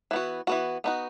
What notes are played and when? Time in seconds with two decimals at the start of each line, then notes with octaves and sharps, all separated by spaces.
0.11 E3 B3 F#4
0.47 E3 B3 F#4
0.84 B3 D#4 F#4